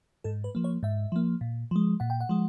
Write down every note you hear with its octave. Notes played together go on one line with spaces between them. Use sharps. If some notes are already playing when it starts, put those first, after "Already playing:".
G#2 A4
B4
F3 A#3
C#5
G#2 E5
F3 A#3
A#2
F3 G#3
A#2 F#5
G5
F#5
F3 G#3